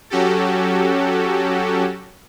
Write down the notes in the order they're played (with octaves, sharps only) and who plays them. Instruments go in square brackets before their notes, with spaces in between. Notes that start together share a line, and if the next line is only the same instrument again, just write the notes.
[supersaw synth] F#3 C#4 F#4 G4 A4